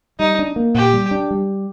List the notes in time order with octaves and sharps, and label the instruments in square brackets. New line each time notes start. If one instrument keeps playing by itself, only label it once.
[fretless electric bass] G3 [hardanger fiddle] D#4
[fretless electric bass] D4
A#3
[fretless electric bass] A#2 [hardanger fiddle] G4
[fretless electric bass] G3
D4
G3